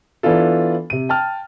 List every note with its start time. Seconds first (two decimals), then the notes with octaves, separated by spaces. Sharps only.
0.23 E3 B3 D4 F4 A4
0.90 C3 D#7
1.09 G5 A5 F6